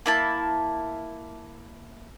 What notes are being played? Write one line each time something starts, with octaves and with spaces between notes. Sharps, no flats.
A#3 E4 A5